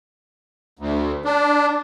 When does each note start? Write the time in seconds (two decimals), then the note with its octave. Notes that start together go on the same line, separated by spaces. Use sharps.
0.79 D2
1.25 D4